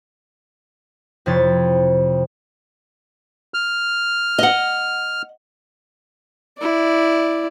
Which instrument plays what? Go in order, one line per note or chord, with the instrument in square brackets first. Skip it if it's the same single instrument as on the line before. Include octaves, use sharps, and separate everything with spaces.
[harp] F2 C3 F3 E4 C#5 A6
[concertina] F6
[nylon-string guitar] D#5 F#5
[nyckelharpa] E4 D5